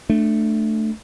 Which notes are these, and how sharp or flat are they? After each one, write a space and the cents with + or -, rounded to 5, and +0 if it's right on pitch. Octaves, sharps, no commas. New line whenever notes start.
A3 +0 D4 +15